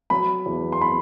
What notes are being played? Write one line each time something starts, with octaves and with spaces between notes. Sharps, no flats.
F#3 B5
E2
C6
B5